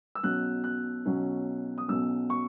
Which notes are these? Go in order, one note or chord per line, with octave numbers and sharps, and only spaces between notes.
E6
B1 B2 F#3 C#4 F#6
F#6
B1 B2 F#3 C#4
D#6
B1 B2 F#3 C#4 E6
C#6